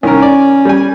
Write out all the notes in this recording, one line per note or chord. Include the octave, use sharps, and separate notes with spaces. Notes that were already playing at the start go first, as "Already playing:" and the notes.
C2 D#3 C#4 A#4
D5
G3 G#5